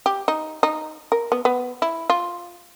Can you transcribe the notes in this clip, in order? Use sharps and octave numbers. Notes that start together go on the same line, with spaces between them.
G4
D#4
D#4
A#4
B3
B3
E4
F4